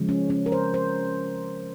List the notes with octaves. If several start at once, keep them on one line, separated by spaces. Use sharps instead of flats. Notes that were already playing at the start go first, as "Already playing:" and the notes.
Already playing: C#3 F3 G#3
C#4
C#4
A#4
C5
C5